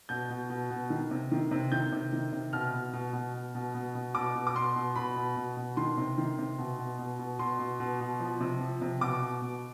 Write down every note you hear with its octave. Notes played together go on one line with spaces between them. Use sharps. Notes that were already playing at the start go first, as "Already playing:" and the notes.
B2 G6
B2
B2
B2
D#3
C3
D#3
C3
D#3 G6
C3
D#3
C3
B2 F6
B2
B2
B2
B2
B2
B2
B2
B2 D6
B2
D6
B2 C6
B2
B2 B5
B2
B2
B2
D#3 C6
C3
D#3
C3
B2
B2
B2
B2
B2 C6
B2
B2
B2
F3
C3
F3
C3
B2 D6
B2
B2